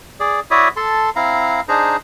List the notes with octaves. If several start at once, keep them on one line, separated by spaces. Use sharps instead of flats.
G#4 D5
E4 F#4 C#5 D5 E5 D#6
A4 A5 C6
C4 E4 F5 A#5
D4 D#4 G#4 C5 A#5